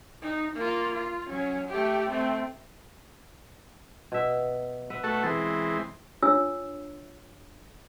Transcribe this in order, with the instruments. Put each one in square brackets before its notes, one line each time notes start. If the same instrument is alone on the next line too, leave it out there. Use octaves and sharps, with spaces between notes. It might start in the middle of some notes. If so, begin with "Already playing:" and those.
[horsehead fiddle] D#4
A#3 F4
F4
F#3 C#4
A3 G4
A3 C4
[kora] B2 E5
B4 E5 F#5
[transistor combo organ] A3 F#4 A4
E3 G#3 C4
[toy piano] D4 F4 C#5 E6